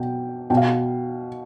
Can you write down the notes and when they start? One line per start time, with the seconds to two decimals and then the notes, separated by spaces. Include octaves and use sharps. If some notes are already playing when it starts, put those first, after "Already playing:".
Already playing: B2 G5
0.50 B2 G5
0.57 F5